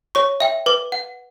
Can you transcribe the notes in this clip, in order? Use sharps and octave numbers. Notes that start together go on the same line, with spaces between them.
C#5 C#6
E5 G5
B4 D6
F#5